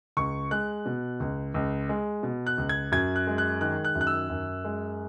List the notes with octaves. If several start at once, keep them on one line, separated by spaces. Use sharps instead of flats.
C#2 C#6
G#3 F#6
B2
C#2
C#2
G#3
B2
F#6
C#2
G#6
F#2 G#6
F#6
G#3
F#6
D#3 F#6
F#6
F#2
F#6
E6
F#2
G#3